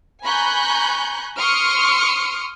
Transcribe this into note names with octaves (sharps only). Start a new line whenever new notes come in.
G#5 A#5 B5 C#6 F#6 G6
C6 C#6 D#6 F6 C#7 D7